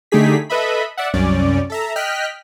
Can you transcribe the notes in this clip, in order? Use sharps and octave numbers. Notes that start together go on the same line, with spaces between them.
D3 A3 D#4 G4 G#4 B6
A4 B4 D#5 E5 B5
D5 E5 F#5
C2 F#2 C#4 D5
A4 E5 A#5
D#5 G5 F6 F#6 B6